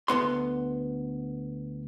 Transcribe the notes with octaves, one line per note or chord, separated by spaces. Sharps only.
D2 G2 B3 C6